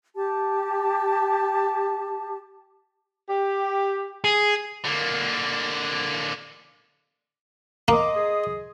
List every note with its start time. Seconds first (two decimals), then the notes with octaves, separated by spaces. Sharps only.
0.16 G4 A5
3.29 G4
4.24 G#4
4.85 D3 A#3
7.88 A#3 D#5 C6 D6 D#6
8.16 G#4